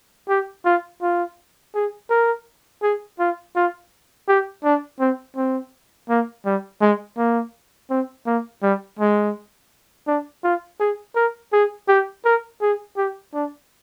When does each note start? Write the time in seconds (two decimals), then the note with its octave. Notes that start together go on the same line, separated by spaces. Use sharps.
0.29 G4
0.65 F4
1.02 F4
1.75 G#4
2.10 A#4
2.82 G#4
3.19 F4
3.56 F4
4.28 G4
4.64 D4
5.00 C4
5.36 C4
6.09 A#3
6.45 G3
6.81 G#3
7.17 A#3
7.90 C4
8.26 A#3
8.62 G3
8.99 G#3
10.07 D4
10.44 F4
10.80 G#4
11.16 A#4
11.53 G#4
11.88 G4
12.25 A#4
12.61 G#4
12.97 G4
13.34 D4